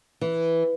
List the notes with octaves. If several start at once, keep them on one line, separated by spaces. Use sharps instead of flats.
E3